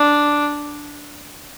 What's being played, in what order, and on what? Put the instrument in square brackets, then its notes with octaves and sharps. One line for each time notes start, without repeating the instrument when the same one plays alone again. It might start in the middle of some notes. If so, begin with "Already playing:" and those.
Already playing: [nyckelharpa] D4